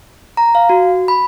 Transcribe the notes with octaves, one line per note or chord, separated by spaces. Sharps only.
A#5
F5
F#4
B5